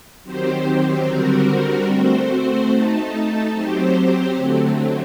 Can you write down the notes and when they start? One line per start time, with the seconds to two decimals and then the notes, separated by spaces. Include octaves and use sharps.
0.23 D#3 F#3 C4 G4 C5
1.05 D3 G3 C4 F#4 A#4
1.89 A3 C4 F#4 C5
2.70 A3 D#4 A4
3.53 F#3 C4 G4 C5
4.36 D3 F#3 A3 C4